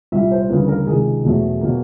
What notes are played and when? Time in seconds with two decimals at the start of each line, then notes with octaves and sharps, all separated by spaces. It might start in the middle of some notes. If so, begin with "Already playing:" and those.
0.12 C2 A#2 G3 E5
0.31 C5
0.49 D2 C#3 E3 G3 A#3 B4
0.68 A#4
0.86 C#2 C3 D#3 G#4
1.24 E2 B2 F#3 A3
1.61 B2 F#3 A#3